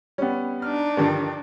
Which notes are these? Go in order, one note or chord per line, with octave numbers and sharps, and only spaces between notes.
G3 B3 C#4 G4
D4 D#4 F6
G2 D3 D#3 F3